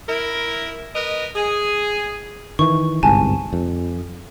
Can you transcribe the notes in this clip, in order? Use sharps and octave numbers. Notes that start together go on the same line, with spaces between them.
E4 A#4
A#4 B4 D#5
G#4
D#3 E3 C#6
G1 C2 G#2 G#5 A5
F2